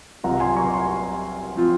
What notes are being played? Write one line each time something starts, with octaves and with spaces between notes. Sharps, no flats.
C2 C3 F#3 C4 F4 F#5 A#5
G#5 C6
A#5 C#6
G#5 C6
F3 C4 F4